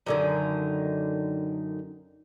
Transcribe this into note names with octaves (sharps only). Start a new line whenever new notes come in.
F#2 D3 D#3